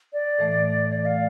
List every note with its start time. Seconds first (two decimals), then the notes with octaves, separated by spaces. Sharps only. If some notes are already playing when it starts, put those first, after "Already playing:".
0.13 D5
0.38 A2 E3 A3
0.89 A2 E3 A3 D5
1.05 F5